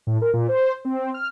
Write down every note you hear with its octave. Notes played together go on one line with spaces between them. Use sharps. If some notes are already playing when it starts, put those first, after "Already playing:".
A2
A#4
A#2
C5
C4
F6